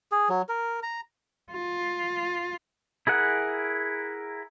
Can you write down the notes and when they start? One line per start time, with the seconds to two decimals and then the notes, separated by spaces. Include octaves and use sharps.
0.12 G#4
0.29 F#3
0.49 A#4
0.83 A#5
1.53 F4
3.07 E4 G#4 A#4 F#5